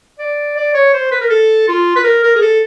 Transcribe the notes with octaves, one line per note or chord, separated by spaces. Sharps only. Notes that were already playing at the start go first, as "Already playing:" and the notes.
D5
D5
C#5
C5
B4
A#4
A4
F4
B4
A#4
A#4
G#4
A4